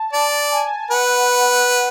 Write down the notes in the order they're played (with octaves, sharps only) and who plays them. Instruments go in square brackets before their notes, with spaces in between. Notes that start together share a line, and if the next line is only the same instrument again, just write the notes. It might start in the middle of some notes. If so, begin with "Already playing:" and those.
Already playing: [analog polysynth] A5
[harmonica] D5 [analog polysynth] A5
[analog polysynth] G#5
[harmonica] B4 [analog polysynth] F#5